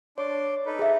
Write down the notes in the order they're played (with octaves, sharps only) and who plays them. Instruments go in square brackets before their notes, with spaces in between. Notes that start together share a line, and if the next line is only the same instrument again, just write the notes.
[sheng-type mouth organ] D4 C6 D6 [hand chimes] C#5
[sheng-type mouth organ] D#4 A4 B4
[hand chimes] G#4 E5